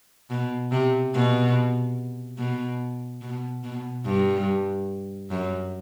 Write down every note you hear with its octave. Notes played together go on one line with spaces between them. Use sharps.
B2
C3
B2
B2
B2
B2
G2
F#2